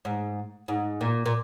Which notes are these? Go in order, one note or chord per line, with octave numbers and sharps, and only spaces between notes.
G#2
G#2
A#2
A#2